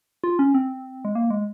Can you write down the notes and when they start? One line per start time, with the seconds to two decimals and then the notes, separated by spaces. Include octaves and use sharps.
0.24 F4
0.39 C#4
0.54 C4
1.05 G#3
1.15 A#3
1.30 G#3